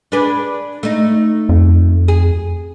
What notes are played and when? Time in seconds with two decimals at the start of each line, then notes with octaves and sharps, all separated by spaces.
0.12 D4 G#4 B4
0.83 A3 D#4
1.49 F2
2.08 G#4